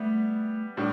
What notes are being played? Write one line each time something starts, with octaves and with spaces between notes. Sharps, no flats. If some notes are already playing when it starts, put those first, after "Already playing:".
Already playing: G3 A3 B3
A2 G3 D4